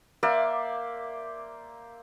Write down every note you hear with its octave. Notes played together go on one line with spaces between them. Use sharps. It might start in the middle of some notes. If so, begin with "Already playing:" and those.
A#3 C5 D5 E5